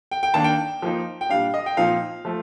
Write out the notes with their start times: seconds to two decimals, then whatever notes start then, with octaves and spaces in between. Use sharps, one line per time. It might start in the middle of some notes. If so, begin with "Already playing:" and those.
0.11 G5
0.23 G5
0.34 D#3 A#3 D4 A5
0.44 G5
0.82 F3 A#3 D#4
1.21 G5
1.29 A#2 G3 D4 F5
1.54 D#5
1.66 G5
1.77 A#2 F3 C4 D#4 F5
2.25 F3 A3